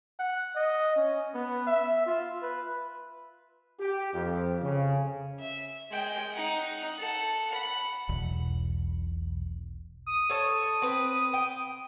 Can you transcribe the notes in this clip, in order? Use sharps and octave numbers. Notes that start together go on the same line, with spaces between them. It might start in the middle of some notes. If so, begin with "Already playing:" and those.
F#5
D#5
C#4
B3
E5
F4
B4
G4
F2
C#3
E5
G#3 G5
D#4 F#5
A4 F#5
F#5 B5
E1 B1 E2
D#6
A4 C#5 A5
C4 B4
G5